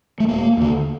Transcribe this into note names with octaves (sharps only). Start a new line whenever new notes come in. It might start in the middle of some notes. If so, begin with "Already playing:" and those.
A3
E1 A#3
D#2 D3